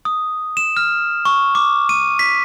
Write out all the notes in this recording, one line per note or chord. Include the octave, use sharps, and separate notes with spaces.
D#6
E7
F6
C#6
D6
D#7
B6